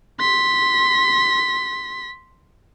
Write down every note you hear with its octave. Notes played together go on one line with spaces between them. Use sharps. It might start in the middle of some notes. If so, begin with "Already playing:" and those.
C6 B6